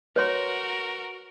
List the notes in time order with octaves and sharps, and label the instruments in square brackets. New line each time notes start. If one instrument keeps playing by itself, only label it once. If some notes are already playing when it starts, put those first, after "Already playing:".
[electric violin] F#4 A#4 [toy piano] B4 C#5 C6